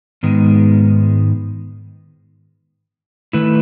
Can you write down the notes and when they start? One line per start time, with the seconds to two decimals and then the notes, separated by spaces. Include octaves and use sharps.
0.23 G#2 D#3 G#3 B3
3.33 D#3 A3 E4 B4